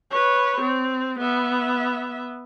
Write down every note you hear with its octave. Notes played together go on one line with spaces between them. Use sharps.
B4 C#5
C4
B3 E5